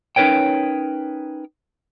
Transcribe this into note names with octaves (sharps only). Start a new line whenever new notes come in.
C#4 D#4 A#4 B4 C#5 G5